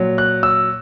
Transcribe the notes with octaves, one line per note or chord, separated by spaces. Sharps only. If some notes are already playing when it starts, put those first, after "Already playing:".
Already playing: A#2 F#3
F#6
E6